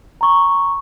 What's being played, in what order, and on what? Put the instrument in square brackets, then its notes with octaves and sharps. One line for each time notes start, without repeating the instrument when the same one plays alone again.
[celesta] A#5 C#6